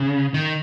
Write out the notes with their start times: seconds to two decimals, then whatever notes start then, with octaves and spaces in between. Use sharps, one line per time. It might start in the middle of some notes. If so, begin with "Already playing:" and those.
Already playing: C#3
0.34 D#3